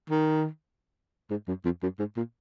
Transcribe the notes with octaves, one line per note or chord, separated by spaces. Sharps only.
D#3
G#2
F#2
F2
F#2
G#2
A#2